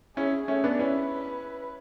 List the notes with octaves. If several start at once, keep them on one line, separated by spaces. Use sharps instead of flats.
C#4 E4 G#4
A3 C#4
B3 D4
C#4 E4 B4